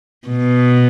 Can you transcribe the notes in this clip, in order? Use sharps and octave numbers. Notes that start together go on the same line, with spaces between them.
B2